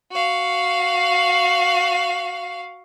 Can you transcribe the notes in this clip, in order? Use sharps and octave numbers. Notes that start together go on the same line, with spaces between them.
F#4 F5